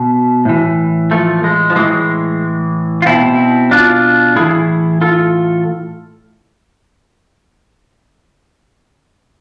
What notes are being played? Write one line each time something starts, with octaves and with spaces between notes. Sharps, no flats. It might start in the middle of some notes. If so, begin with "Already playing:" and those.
Already playing: B2
A2 E3
F3 A3
G#3
F3
A2 E3 G#3
F4
B2 C4 E4
D4 F4
A2 E3 E4 G#4
F4 A4